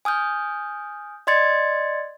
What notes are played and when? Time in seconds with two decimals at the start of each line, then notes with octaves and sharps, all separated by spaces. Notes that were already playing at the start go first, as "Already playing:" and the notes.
0.05 G#5 D#6 F6 G6
1.27 D5 D#5 C6 G#6 A6 C#7